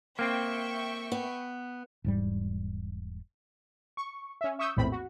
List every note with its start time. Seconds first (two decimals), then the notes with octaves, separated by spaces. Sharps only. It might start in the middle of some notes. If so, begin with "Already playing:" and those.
0.19 A#3 C4 E5 G5 C#6
1.12 B3
2.04 E1 G#2 G3
3.97 C#6
4.41 C#4 E5
4.59 E5 C#6 D#6 E6 G6
4.77 A#1 E2 A2 C4 B5
4.92 F#4